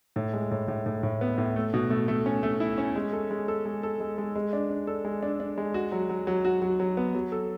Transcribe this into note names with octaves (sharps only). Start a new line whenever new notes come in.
A2
G#3
A2
A2
A2
A2
B3
A2
A3
B2
A3
A3
C#4
A3
E4
C#4
G#3
A4
G#3
A4
G#3
A4
G#3
G#3
G#3
D4
D4
A4
G#3
D4
D4
G#3
F#4
F#3
F#3
F#3
F#4
F#3
F#3
B3
F#3
A4